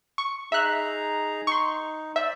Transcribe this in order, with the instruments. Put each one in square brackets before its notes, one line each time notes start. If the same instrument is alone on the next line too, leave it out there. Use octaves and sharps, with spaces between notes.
[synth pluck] C#6
[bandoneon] D#4 G#4 A#5 [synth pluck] E5 F#6
[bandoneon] D#4 [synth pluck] C6 C#6
[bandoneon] C5 D5 [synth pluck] E5